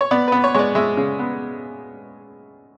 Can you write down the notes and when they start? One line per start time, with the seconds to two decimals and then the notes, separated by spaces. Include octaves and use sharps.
0.01 C#5
0.11 B3 D5
0.28 B3 B4
0.44 C#5
0.54 G#3 C#5 D5
0.75 G#3 E5
0.97 C#3
1.19 B3